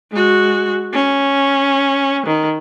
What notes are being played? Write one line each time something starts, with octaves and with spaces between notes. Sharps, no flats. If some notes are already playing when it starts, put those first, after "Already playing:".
G#3 F#4
C#4
D#3